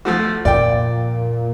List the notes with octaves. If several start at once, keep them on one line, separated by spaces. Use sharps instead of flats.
F3 A3 F#4
F2 A#2 D5 G5